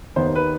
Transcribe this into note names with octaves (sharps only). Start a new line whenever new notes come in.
D#2 D#3 B3 C5
B4